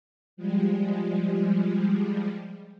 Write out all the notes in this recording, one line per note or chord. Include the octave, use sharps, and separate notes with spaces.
F3 G3 G#3